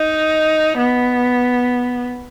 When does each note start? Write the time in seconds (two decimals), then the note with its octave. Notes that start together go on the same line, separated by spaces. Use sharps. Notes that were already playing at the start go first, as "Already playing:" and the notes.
Already playing: D#4
0.78 B3